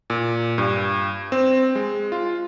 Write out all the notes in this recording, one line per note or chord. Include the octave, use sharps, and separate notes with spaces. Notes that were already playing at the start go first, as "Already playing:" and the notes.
A#2
G2
C4
G#3
F4